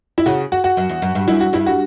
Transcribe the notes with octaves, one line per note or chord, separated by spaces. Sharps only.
E4
C#3 F#4
F#4
F#4
F#2
E2
F#2
G2
F#2 E4
F#4
G2 E4
F#4